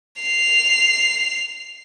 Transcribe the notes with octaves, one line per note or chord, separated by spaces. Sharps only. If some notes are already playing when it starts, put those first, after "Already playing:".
C7 F7